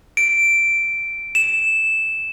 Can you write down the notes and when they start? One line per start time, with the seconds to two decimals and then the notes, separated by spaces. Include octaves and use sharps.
0.17 D7
1.35 E7